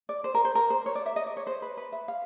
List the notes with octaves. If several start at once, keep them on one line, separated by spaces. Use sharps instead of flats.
D5
C5
A#4
C5
A#4
C5
C#5
D5
E5
D#5
D5
C#5
C5
B4
B4
E5
F5